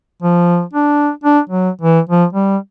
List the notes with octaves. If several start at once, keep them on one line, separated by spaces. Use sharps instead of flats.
F3
D4
D4
F#3
E3
F3
G3